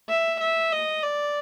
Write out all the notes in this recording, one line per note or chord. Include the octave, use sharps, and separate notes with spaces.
E5
E5
D#5
D5